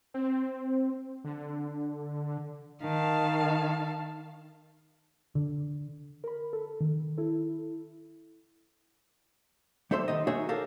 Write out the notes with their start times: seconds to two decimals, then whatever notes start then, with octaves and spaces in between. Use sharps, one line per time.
0.14 C4
1.25 D3
2.82 D#3 F5 A5
5.35 D3
6.24 A#4 B5
6.53 A4
6.80 D#3
7.18 E4 A4
9.91 G3 D#4 A4 C5 E5 C6
10.08 D#3 D#4 D#5
10.27 D#4 F#4 G#4 C#5 E5
10.49 G4 A4 A#4 F5